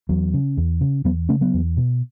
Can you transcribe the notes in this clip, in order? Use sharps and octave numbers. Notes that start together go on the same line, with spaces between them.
E2 F#3
C#3
E2
C#3
E2 F#3 B3
C#3 A3 C#4
F#3 B3
E2
B2